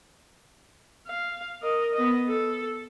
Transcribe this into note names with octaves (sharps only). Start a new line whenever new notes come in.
F5
A#4 D#5
B3 D#5
A4